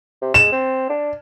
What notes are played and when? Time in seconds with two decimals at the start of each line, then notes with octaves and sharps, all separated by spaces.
0.22 C3
0.34 G#3 E7
0.52 C4
0.89 D4